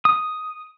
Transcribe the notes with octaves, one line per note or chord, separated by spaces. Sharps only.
D#6